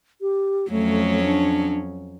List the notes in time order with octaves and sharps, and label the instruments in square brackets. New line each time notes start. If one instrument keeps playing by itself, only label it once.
[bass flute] G4
[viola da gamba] F2 F#3 C#4 [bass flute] A3
[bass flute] D4